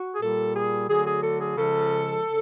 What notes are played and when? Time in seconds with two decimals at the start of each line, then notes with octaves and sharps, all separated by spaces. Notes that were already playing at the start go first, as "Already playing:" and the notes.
Already playing: F#4
0.14 G#4
0.21 A#2 G3 A4
0.55 G#4
0.89 D3 F#3 A3 G#4
1.06 G#4
1.23 A4
1.40 G#4
1.57 C#3 F3 G#3 A4
2.25 C#3